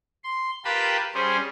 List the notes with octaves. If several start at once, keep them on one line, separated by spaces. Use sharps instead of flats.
C6
F4 G4 A#4 B4 A5 B5
G3 C#4 G#4 C5